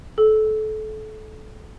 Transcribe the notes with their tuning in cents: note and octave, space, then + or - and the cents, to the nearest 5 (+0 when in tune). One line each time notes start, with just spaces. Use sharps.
A4 -25